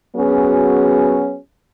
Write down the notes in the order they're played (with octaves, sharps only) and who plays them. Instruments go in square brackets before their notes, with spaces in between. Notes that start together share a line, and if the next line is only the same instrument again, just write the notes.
[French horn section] F#3 B3 C#4 F#4 G#4